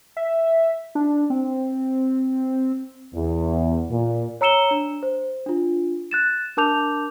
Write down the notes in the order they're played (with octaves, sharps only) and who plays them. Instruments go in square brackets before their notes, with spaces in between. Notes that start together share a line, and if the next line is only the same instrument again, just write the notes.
[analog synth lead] E5
D4
C4
[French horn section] E2
A#2
[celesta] C#5 A#5 E6 C#7 E7 G7
D4
C5
D4 F4
F#6 A6 E7
D4 A#4 A5 D6 G6 F7